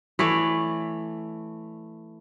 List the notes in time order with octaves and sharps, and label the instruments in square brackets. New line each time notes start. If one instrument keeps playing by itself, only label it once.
[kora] E3 A3 C#5 D5